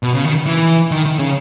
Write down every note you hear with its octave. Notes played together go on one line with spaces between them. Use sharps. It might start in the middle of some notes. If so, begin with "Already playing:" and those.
B2
C#3
D#3
E3
D#3
D#3
C#3